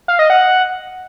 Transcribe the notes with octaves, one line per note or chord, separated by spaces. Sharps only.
F5
D#5
F#5